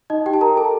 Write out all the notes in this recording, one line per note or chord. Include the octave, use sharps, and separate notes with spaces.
D#4 D#5
G4 G5
A5
A#4 A#5
A4 A5